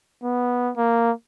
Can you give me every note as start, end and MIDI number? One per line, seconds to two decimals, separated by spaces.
0.23 0.71 59
0.77 1.11 58